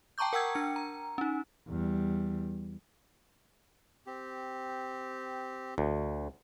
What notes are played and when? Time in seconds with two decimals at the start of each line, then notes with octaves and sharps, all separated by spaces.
0.18 G5 A5 A#5 C#6 D6 G6
0.33 A#4 F#5 G5 E6 G#6
0.55 D4 C#7
0.76 A#5
1.18 C#4 D#4
1.68 E2 G3
4.06 C4 G4
5.78 D2